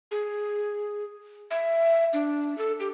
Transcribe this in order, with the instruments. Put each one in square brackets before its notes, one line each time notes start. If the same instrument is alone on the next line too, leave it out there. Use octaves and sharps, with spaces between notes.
[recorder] G#4
E5
D4
A4
G4